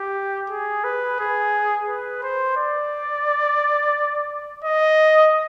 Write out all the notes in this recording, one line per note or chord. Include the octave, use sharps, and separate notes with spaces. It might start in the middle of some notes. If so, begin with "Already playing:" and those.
Already playing: G4
G#4
B4
G#4
B4
C5
D5
D#5